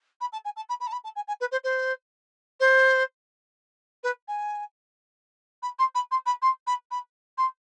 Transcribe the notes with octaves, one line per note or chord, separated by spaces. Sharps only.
B5
A5
G#5
A5
B5
B5
A5
B5
A5
G#5
G#5
B4
C5
C5
C5
B4
G#5
B5
C6
B5
C6
B5
C6
B5
B5
C6